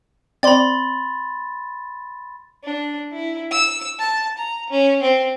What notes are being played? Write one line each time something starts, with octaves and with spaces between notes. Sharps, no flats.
C4 D5 B5 C6 A6
D4
E4
E6
A5
A#5
C#4
C4